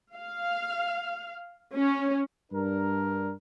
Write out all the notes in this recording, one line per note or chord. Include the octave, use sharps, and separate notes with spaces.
F5
C#4
G2 D4 A#4